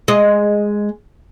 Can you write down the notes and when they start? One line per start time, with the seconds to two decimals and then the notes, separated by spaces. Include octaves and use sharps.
0.08 G#3 D#5